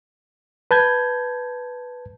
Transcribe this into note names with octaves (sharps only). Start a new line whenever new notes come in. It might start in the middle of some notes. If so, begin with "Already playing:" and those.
B4 A5 G6 G#6